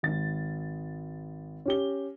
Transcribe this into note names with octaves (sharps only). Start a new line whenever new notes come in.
G#1 A6
C#4 G4 G7